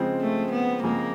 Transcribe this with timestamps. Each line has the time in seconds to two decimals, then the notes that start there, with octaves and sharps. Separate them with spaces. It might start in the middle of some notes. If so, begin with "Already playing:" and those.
Already playing: C#3 F3 G#3 C4
0.20 A3
0.52 B3
0.83 C#3 F3 G#3 A#3 C4